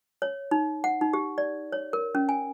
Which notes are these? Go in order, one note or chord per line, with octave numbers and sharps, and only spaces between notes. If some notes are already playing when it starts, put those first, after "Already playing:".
C#5
D#4
F#5
D#4
G4
D5
C#5
A#4
C#4
G#5